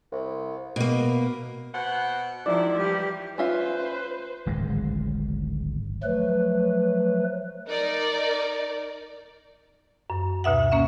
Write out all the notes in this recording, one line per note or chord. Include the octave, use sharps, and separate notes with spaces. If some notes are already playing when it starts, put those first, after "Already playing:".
C2
B2 A#3
B2 C5 F#5
D#3 F3 G3 E4 D5
E3 G3 G4
C#4 F4 B4 C5 E5
D1 G#1 G#3
F3 F#3 A3 B4
D#4 A#4 D5
F#2
D2 B2 E5 F#5
A#3 C#4 E5